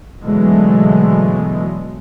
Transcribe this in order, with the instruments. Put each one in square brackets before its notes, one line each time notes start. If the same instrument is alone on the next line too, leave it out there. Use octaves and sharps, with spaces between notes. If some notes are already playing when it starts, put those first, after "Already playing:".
[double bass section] B2 D3 E3 F#3 G#3 A3